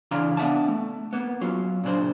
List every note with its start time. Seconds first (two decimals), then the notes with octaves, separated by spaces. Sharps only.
0.11 C#3 E3 D4 F5 A#5 C6
0.37 B3 D4 E5 F#5 A5
0.68 A3
1.13 A#3 B3
1.41 F#3 C#4 F4
1.83 A#2 C#3 D4 C5